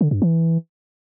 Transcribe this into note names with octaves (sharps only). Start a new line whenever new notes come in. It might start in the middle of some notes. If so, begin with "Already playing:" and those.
D3
G2
E3